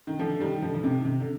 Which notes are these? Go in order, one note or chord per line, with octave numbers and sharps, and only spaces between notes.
D#3
D3 F3
D#3 G3
D3 F3
F3
C3 D#3
C3
D3